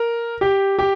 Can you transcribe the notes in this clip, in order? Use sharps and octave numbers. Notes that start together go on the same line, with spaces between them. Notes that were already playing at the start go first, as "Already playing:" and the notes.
Already playing: A#4
G4
G4